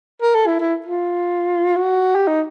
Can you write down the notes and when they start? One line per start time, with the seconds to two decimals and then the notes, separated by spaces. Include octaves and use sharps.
0.22 A#4
0.35 A4
0.47 E4
0.60 E4
0.86 F4
1.76 F#4
2.15 G4
2.27 D#4